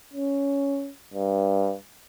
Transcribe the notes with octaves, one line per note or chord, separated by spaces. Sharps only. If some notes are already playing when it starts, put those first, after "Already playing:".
C#4
G2